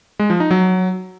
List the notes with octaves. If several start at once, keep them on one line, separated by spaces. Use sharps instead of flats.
G#3
F3
D#4
F#3